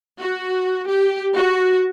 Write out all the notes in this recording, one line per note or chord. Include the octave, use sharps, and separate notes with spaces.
F#4
G4
F#4